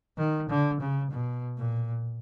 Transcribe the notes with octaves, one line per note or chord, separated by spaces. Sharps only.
D#3
D3
C#3
B2
A#2